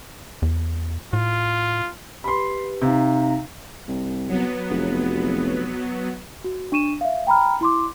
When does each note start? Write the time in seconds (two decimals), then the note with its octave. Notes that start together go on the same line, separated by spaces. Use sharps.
0.42 E2
1.13 A2 F4
2.24 G4 B4 B5 C6
2.82 C3 D#4 F5 A#5
3.88 C2
4.28 F#3 B3
4.70 F1
6.44 F#4
6.72 D4 C#6 D#7 E7
7.01 E5 F5
7.27 G5 A#5 B5 F6
7.61 E4 C6 D6